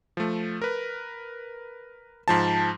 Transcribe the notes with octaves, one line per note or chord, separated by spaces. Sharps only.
F3 A3
A#4 B4
G#2 F3 A5